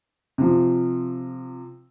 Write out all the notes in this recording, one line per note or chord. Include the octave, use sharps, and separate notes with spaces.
C3 F3